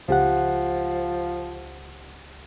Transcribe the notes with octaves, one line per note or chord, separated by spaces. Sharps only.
C#2 F3 G4 F#5